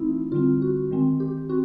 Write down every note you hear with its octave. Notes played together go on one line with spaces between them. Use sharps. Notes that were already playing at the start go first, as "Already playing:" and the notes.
Already playing: E3 A3 C4 D#4 E4
D3 G3 C4 F4
F#4
D#3 G#3 C4
G4
C4 F#4